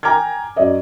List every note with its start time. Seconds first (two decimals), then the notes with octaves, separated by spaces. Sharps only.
0.03 G5 G#5 A#5 D6 F6 G#6
0.56 F#2 D5 D#5